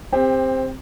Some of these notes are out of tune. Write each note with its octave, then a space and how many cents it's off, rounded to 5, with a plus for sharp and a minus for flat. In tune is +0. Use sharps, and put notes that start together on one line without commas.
C4 +5 G4 +30